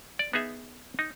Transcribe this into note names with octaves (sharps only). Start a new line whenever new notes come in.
D5
B3 D#4 G#4 E5
D#4